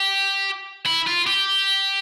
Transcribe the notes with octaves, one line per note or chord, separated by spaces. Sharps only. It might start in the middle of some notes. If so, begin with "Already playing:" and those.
Already playing: G4
E4
F4
G4